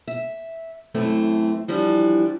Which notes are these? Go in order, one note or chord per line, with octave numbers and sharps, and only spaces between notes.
E5
F#2 E3 A3 C4
E3 F3 G3 D4